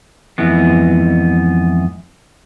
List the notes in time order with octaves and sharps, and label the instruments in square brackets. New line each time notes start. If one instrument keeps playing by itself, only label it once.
[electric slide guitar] F2 G#2 E3 B3